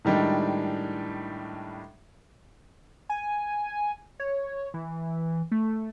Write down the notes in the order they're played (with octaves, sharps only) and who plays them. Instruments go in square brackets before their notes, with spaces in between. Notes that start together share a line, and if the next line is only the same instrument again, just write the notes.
[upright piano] A2 D#3 G3 G#3 D4
[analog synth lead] G#5
C#5
E3
A3